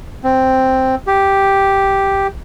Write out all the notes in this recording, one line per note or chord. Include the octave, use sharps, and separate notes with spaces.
C4
G4